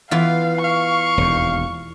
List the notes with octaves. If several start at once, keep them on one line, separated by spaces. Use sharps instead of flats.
E3 B3 F4 F5
F5 C#6
E1 D#2